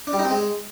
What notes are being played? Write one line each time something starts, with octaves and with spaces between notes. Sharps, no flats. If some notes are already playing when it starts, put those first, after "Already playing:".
D4
G3
D#4
C4
G#3